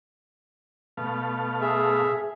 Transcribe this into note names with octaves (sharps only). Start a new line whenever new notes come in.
B2 A3 F5
G#4 E5